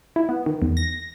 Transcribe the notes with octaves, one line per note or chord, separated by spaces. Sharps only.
E4
B3
D#3
E2
A#6